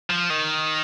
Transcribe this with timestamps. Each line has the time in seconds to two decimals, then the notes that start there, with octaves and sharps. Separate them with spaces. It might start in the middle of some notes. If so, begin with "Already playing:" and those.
0.10 F3
0.30 D#3